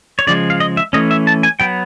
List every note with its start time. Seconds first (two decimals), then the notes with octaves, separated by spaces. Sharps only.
0.19 C#5
0.27 C#3 F3 G#3 D5
0.50 F5
0.60 D#5
0.77 E5
0.93 E3 A3 C#4 D#5
1.11 E5
1.27 A5
1.43 G#5
1.60 F#3 B3 G5